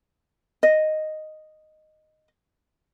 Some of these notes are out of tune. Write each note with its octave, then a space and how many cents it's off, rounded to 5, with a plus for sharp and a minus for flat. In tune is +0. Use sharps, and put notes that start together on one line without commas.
D#5 -5